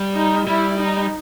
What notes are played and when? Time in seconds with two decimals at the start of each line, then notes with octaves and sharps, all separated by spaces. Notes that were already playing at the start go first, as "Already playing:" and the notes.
Already playing: G3
0.15 D#4
0.47 G3 E4
0.78 D#4